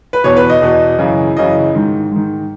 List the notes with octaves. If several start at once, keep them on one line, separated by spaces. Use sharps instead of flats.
B4
E2 B2 C#5
B4
D#5
E2 B2
F#2 C#3 E3
F#2 C#3 E3 D#5
G#2 D#3
G#2 D#3